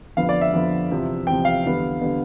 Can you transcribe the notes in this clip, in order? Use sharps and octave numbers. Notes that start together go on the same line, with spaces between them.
F2 D3 F3 B3 F5
D5
E5
F2 D3 F3 B3
E2 C3 F3
E2 C3 F3 G5
F5
E2 D3 G3 B3
D3 G3 B3